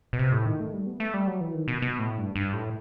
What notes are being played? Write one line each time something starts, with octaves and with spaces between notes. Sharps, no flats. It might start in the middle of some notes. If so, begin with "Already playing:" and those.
B2
C3
A2
D#3
A3
G3
B3
A3
G3
F#3
E3
D#3
B2
B2
A2
G2
G2
A2